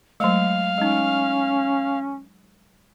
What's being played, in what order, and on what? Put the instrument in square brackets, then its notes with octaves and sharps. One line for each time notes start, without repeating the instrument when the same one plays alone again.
[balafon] F#3 G#3 A3 [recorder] F5
[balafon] G#3 D#4 [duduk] C#4